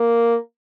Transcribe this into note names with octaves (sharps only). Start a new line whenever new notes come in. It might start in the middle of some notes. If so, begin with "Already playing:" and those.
Already playing: A#3